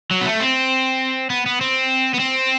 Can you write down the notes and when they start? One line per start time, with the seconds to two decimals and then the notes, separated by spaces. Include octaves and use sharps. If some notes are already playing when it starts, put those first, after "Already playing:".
0.11 F#3
0.21 B3
0.25 A3
0.40 C4
1.30 B3
1.46 B3
1.61 C4
2.14 B3
2.20 C4